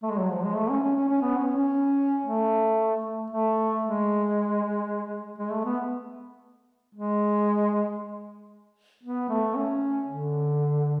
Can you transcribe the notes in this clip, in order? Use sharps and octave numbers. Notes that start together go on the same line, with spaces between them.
A3
G#3
F#3
F3
G#3
A3
C#4
C#4
C#4
C#4
B3
C#4
C#4
A3
A3
G#3
G#3
A3
B3
G#3
B3
A3
C#4
D3